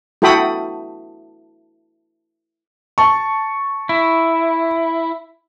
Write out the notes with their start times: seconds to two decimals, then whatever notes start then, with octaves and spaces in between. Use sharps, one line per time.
0.22 E4 F#4 A4 G5 B5 D#6
2.98 A5 C#6
3.89 E4